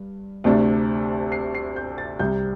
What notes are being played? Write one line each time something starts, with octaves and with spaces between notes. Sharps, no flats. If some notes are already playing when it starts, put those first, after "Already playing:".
Already playing: G2
D2 C3 A3 D4
C7
C7
G6
A6
C2 C3 G3 G6